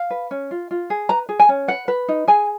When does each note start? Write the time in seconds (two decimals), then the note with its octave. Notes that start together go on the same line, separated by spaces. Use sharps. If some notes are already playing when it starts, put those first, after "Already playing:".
Already playing: F5
0.11 B4
0.31 C#4
0.51 F4
0.71 F4
0.90 G#4
1.09 B4 A#5
1.29 G#4
1.40 G#5
1.49 C#4
1.68 B4 F#5
1.88 B4
2.09 D#4
2.28 G#4 G#5